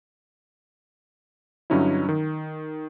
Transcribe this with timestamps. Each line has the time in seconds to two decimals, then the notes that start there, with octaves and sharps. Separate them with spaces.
1.70 G2 D3 F#3 C#4 D#4 E4
2.09 D#3